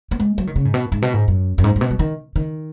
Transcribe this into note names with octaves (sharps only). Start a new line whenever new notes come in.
B3
G#3
F#3
D#3
C#3
G#2
B2
G#2
B2
G#2
F#2
F#2
G#2
G#2
B2
F#3
D#3
D#3